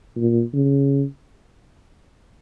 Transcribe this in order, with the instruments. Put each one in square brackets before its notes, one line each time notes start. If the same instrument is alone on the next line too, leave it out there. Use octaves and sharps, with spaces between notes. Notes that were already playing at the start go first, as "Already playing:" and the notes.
[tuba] A#2
C#3